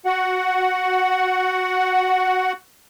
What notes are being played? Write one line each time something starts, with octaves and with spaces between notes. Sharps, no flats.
F#4 F#5